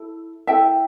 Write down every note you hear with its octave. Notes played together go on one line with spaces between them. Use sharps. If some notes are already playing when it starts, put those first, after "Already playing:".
Already playing: E4 A4
E4 A4 E5 G5